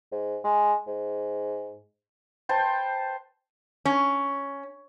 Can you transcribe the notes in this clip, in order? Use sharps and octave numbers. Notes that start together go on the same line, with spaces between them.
G#2
G#3
G#2
B4 C5 G5 A5
C#4